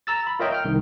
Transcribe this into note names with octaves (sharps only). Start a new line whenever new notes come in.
A#5 E6 A6
B5
F4 A#4 C#5 D#5 E5 G5
G5 F6
C2 D#3